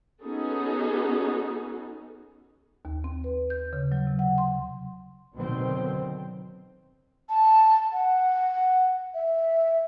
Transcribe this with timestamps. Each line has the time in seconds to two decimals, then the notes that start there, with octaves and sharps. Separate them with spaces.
0.23 B3 C#4 D#4 F#4 G#4 A4
2.85 D#2
3.04 C4
3.24 B4
3.50 G6
3.73 C#3
3.92 F#3
4.07 C3
4.19 F#5
4.38 C6
5.36 B2 D3 D#3 F#3 C4
7.29 A5
7.92 F#5
9.14 E5